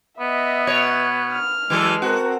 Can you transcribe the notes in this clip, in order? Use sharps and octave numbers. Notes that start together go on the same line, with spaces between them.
B3 D#5 E5
B2 C#5
F6
E3 F#3 G#3 A4
C4 F#4 A#4